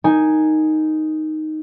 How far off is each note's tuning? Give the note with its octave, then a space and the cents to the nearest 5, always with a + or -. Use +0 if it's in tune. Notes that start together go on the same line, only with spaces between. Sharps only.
D#4 +0 A#4 +0 G#5 +0